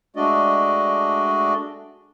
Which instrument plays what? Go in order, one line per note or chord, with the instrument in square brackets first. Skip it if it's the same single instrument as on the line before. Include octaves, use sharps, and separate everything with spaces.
[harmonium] G#3 A3 D4 F#4 D5 D#5